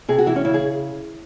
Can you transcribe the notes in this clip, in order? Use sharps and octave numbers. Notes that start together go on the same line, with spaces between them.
C3 G#4
F#4
E3 E4
C#4
C#3 E4
G#4